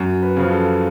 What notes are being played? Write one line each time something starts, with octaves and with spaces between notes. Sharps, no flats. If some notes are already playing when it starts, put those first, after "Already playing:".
Already playing: F#2
B4
C#3 F3
A4